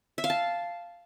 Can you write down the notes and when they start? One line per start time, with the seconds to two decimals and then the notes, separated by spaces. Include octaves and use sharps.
0.18 E5
0.24 F5
0.30 A5